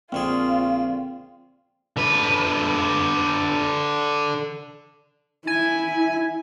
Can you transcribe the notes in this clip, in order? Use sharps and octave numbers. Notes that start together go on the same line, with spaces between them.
A#1 D3 C4 F4 G#4
D3 B4
E4 G#5